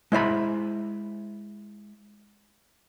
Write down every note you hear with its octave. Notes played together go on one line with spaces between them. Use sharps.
G#3 E4 C5 B5